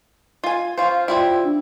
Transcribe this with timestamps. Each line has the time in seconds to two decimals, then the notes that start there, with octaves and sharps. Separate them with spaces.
0.44 F4 G#5
0.78 C#4 F4 C5 F5
1.08 G3 C4 E4 F4
1.44 D4